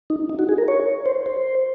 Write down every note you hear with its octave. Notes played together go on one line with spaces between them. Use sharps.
D#4
D#4
F#4
G#4
A#4
C#5
C5
C5